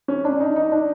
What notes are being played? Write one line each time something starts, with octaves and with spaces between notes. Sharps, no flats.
C#4
D4
D#4
D#4
D4